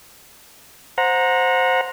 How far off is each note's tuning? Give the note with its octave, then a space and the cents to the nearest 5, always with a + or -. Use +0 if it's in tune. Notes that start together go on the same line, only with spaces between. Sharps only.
C5 +0 F#5 -25 A#5 +0